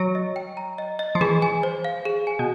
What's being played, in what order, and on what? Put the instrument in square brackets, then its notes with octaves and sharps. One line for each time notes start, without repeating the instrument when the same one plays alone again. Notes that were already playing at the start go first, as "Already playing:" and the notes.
Already playing: [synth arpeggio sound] F#3
[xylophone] D#5
G5
A#5
D#5
D#5
[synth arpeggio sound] F3
[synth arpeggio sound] E3 [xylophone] G#4
[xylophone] G#5
C5
F5
G#4
G#5
[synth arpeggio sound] B2